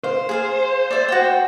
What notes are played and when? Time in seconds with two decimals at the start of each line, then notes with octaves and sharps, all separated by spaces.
0.04 C5 F5
0.29 G#4 F5 G#5
0.91 D5 E5
1.09 F#4 G5